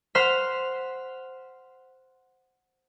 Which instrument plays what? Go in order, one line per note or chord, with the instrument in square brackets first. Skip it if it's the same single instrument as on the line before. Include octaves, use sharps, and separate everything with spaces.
[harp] C5 F#5 C6 F6 B6